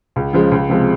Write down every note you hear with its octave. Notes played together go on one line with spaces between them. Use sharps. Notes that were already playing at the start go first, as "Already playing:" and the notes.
C#2
C#3 F3 G#3
C#2
C3 F3 G#3